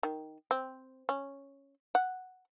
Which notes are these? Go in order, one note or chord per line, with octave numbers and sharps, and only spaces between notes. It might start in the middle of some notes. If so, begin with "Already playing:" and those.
D#3
C4
C#4
F#5